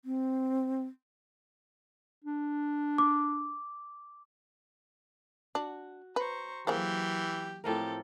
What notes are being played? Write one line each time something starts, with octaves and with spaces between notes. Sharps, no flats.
C4
D4
D6
D4 F#4
B4 C5 A#5 C#6
E3 F#3 A#3 G4 G#4 C5
A2 F3 C4 G4 A4 A#4